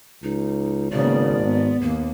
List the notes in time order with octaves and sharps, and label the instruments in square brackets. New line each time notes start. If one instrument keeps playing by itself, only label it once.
[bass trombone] C#2 [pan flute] D#4
[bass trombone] G#1 [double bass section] C#3 A#3 B3 [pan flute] D5
[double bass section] G#2 [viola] B3
[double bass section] D#2 [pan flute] A#3